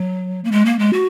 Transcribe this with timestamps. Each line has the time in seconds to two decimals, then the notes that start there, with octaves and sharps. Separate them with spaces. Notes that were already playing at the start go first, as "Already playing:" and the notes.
Already playing: F#3
0.44 A#3
0.52 G#3
0.65 A#3
0.79 G#3
0.93 F#4